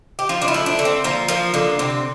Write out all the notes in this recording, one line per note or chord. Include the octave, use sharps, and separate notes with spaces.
G4
F3 F4
D4
E4
A3
D4
D3
C4
F3 A#3
F3 A#3
D3 A#3
C3 C4